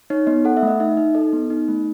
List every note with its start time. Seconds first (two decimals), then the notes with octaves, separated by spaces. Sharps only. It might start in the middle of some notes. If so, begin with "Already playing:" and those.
0.10 D#4 C#5
0.27 B3 D#5
0.45 A4 F#5
0.57 E5
0.63 A3 D#5
0.80 D#4 E5
0.97 D#4
1.15 A4 D#5
1.33 B3
1.50 D#4
1.68 A3